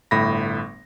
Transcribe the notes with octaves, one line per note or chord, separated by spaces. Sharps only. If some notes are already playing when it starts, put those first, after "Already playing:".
G1 A2 B5 A#6